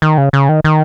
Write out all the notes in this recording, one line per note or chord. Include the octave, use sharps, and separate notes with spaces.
D#3
C#3
C#3
D#3
D#3